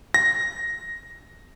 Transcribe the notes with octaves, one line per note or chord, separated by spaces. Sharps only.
A#6